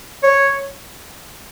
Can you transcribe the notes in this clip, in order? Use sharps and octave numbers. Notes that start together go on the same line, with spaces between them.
C#5